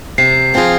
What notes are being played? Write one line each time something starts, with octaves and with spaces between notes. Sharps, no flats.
C3 C7
F3 C4 F4 G#4